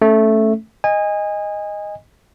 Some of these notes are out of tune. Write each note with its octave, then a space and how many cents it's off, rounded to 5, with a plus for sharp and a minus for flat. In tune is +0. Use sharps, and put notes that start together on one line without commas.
A3 +0 C#4 +0
D#5 +0 G#5 -25